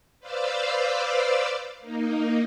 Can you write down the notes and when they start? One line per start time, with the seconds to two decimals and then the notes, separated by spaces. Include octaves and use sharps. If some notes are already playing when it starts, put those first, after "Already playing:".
0.19 B4 C5 D5 F5 D6 E6
1.80 A#3 D#4